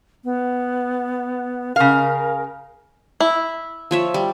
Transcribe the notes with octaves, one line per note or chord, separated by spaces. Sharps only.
B3
C#3 A#4 F5
E4
F3 C#5 E5
G3